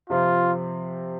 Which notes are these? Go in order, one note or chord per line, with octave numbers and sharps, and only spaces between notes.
C3 F3 C4 F4